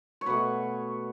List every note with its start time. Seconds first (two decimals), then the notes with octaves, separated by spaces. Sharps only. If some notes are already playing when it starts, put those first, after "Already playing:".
0.21 C#5
0.26 B2 A3 B4